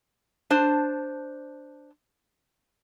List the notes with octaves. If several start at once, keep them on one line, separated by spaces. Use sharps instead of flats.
D4 C5 A5